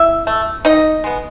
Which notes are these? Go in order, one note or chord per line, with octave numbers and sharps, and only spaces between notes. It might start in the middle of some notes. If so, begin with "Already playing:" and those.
Already playing: E4 E5
A3
D#3 D#4 D#5
G#3 B3